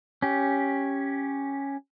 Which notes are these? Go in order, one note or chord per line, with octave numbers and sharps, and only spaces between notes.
C#4 G4